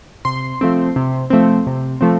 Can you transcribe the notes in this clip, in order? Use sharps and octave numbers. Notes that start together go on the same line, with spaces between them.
C3 C6
F3 A3 C4
C3
F3 A3 C4
C3
F3 A3 C4